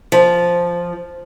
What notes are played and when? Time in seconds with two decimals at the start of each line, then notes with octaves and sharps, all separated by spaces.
0.12 F3